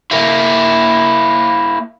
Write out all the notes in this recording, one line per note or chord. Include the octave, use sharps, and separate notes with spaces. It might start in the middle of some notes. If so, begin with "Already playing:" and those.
A#3 E4